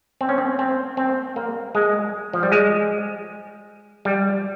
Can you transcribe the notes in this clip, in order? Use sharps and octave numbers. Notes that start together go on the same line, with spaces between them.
C4
C#4
C4
C4
C4
A#3
G#3
F3
G3
G#3
G3